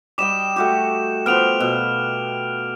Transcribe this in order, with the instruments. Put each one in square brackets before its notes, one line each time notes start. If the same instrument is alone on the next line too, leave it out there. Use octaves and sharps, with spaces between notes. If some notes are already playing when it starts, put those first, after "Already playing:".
[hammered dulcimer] G3 D#5 G5 [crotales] D6 E7
[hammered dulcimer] A3 F#4 G4
[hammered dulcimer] F3 B3 [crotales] F6 D7 F7
[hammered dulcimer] B2